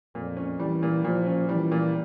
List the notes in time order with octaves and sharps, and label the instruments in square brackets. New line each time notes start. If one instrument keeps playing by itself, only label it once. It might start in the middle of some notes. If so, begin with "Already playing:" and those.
[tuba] F2 [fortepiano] A#2
[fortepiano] C#4
[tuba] E3 [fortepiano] G3
[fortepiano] A#2
[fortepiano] A#2 [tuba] F3
[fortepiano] C#4
[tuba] E3 [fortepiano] G3
[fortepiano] A#2